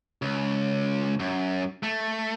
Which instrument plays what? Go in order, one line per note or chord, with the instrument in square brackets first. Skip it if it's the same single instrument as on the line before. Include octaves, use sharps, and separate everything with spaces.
[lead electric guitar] C#2
F#2
A3